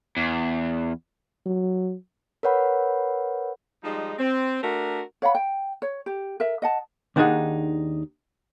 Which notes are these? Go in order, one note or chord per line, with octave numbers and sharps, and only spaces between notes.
E2
F#3
A#4 B4 C#5 F#5 B5
F3 G3 G#3 D#4
C4
A3 D4 F#4 A#4
C#5 F5 F#5 B5
G5
C#5
G4
A#4 E5
D#5 F#5 A5
D#2 D#3 D4 D#4 G#4 F#5